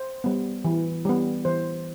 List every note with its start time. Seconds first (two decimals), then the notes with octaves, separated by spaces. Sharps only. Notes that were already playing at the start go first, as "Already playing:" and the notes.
Already playing: C5
0.24 G3 B3
0.65 E3
1.05 G3 B3
1.45 E3 C5